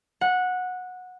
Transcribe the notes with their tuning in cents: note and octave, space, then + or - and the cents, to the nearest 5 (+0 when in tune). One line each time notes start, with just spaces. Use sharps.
F#5 -15